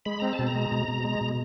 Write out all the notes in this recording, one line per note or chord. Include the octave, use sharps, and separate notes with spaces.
G#3 B5
C4 A#5
A5
B2
A#5
G#3
B2
B2
G#3
B2